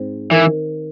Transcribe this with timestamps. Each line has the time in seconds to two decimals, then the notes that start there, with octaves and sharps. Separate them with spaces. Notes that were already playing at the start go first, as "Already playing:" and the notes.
Already playing: G#2 C4
0.31 D#3 E3